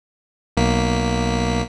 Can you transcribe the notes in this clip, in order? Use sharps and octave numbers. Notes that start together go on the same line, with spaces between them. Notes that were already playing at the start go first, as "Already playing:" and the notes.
B1 A#3 B6